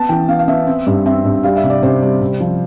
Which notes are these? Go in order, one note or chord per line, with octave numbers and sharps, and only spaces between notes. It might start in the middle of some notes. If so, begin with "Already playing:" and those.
Already playing: B3 A5
E3 G5
B3 F5
F5
B3 E5
C4
G2
C4 E5
G2
G3 F5
E5
C3
D5
C3 C5
G3
C3
F3